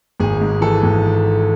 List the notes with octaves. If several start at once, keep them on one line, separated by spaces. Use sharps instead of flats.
G#1 G#4
G#2
E3 A4
G#1